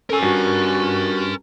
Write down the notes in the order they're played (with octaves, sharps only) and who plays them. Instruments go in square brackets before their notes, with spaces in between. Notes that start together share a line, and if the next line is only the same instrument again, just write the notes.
[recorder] C#4 [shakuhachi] A4 [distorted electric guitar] A#4 G#5
[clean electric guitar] G2 [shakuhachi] F#4